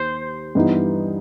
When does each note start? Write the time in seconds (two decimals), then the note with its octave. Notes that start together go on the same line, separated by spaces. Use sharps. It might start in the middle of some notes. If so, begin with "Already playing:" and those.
Already playing: D#2 C5
0.55 G2 E3 G3 B3 D#4